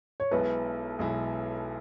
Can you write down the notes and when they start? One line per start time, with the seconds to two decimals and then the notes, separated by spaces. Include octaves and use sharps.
0.20 C#5
0.31 B1 B2 G#3 E4 B4
0.99 B1 B2 G#3 E4